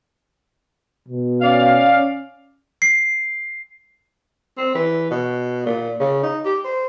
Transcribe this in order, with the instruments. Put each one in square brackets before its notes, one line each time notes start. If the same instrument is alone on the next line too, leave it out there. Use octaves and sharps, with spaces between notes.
[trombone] B2
[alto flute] C#4 [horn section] D5 F5
[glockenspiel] C7
[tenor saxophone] C4
E3
B2
A#2
C#3
D#4
G4
C5